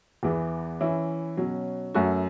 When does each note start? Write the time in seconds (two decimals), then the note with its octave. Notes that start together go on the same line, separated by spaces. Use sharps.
0.23 E2 E3 B3
0.81 E3 C#4 E4
1.37 B2 F#3 C#4
1.94 F#2 F#3 A3 F#4